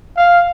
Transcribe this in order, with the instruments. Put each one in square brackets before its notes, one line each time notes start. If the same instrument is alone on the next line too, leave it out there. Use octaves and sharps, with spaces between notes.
[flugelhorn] F5